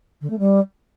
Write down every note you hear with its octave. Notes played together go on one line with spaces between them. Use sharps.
D3
A3
G3